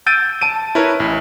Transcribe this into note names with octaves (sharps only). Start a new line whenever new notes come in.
E6 G6 A6 D7 D#7
A5 D7 D#7
E4 A#4 B4 C#5
A1